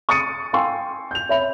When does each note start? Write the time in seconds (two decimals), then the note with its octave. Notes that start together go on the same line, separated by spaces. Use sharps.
0.09 C#6 D#6 A6 C#7 D#7
0.53 F5 G5 G#5 C6 C#6 E6
1.11 G6 F7
1.29 C#5 E5 B5 F7